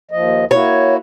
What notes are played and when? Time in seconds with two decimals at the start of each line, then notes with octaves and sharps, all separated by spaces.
0.11 D#2 F3 D#5
0.51 A#3 E4 F#4 C#5